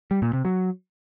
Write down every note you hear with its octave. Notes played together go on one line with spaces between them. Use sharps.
G3
A#2
C3
F#3